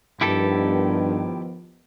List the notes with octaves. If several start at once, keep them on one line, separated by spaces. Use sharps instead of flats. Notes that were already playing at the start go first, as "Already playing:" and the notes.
G2 D#3 F3 B3 E4 G4 A4